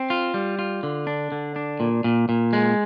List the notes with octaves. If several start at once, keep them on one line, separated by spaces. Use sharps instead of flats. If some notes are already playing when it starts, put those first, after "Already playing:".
Already playing: C4
F4
G3
F4
D3
D4
D3
D4
A#2
A#2
A#2
G#3